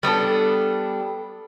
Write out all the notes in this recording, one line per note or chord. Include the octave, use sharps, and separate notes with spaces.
G3 B3 D4 A4